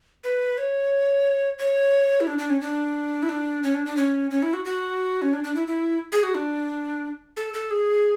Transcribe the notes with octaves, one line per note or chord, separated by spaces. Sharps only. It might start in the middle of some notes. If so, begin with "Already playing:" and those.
B4
C#5
C#5
E4
D4
D4
C#4
D4
E4
D4
C#4
D4
D4
C#4
C#4
E4
F#4
F#4
C#4
D4
D4
E4
E4
G#4
F#4
D4
A4
A4
G#4